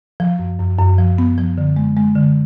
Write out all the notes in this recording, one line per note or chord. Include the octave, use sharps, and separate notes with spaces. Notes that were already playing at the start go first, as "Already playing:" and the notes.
F3
F#2
F#2
F#2
F3
B3
F3
D3
G#3
G#3
D3